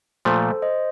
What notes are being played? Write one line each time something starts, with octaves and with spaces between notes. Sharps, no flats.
A#2 F3 A3 A4 C5
C5 D#5